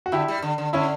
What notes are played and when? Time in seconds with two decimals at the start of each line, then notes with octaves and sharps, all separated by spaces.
0.06 F#4
0.12 D3 E4 G4
0.28 G3
0.42 D3
0.58 D3
0.73 D3 C#4 E4